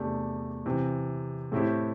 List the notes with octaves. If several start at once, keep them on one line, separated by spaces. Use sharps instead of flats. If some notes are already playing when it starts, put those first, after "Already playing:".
Already playing: E2 C3 A3 D4 G4
C3 E3 C4
A2 A3 C4 E4 G4